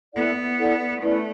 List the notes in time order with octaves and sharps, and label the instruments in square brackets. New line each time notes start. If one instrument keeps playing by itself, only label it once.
[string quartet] B3 [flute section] E4 A4 D5 F#5
[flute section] E4 A4 D5 F#5
[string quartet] A3 [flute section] C#4 E4 B4 D5